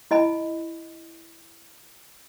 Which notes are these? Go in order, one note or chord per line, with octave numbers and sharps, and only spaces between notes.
E4 D#5 G#5 B5